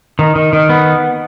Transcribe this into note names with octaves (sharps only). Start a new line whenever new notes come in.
D#3
D#3
D#3
B3